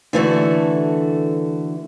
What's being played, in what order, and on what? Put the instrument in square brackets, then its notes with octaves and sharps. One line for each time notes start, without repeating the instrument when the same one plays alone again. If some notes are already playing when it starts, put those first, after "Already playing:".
[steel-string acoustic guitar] D3 E3 A3 F#4